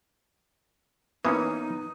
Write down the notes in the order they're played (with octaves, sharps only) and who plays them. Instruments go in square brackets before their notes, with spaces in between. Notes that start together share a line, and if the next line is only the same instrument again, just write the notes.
[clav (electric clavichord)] E3 A#3 C#4 [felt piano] B3 D#6 [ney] D#4